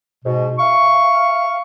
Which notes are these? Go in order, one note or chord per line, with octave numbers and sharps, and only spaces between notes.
G#2 B2
E5 F5 C#6